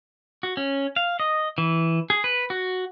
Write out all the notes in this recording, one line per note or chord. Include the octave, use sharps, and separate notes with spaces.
F#4
C#4
F5
D#5
E3
G#4
B4
F#4